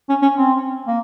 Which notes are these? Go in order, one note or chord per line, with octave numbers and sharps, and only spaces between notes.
C#4
C#4
C4
A#3